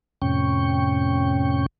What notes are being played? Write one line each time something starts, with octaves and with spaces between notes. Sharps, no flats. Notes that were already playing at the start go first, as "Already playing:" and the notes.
F2 A2 C3 C#4 G5 C#6